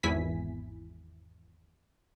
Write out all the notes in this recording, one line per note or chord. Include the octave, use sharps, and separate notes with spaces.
G#1 E2 E4 G#5 B6